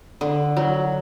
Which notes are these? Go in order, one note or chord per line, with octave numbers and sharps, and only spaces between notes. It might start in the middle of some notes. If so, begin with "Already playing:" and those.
D3
F#3